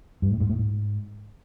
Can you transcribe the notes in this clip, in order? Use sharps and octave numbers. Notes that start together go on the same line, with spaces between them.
G2
A2
G#2
A2
G#2